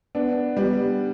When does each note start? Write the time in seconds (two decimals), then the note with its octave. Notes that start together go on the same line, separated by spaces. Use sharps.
0.15 B3 D4
0.57 G3 B3